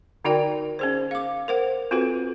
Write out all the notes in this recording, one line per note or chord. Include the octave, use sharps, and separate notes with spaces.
D3 D#4 F#4 A#4 D5 G5
C#4 G#4 C5
F5 D6
A#4 C5 F#5
C4 F4 F#4 A4 B4